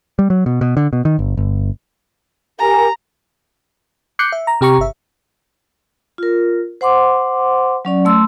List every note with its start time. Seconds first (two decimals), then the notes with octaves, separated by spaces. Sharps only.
0.19 G3
0.30 F#3
0.46 B2
0.61 B2
0.77 D3
0.93 B2
1.05 D#3
1.19 G1
1.37 G1
2.59 G4 A#4 G#5 A#5
4.19 D6 F#6 G6 C7 C#7
4.32 E5
4.47 A#5
4.61 C3 G4 A#5 C#6
4.78 G1 E5
6.18 F4 A#4
6.81 C5 F#5 C6 D6
7.85 F#3 C#4 D5
8.05 A3 C6 E6